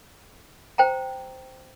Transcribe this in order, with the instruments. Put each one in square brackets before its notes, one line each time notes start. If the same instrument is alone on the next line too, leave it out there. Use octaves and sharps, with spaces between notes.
[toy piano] C5 G5 A#5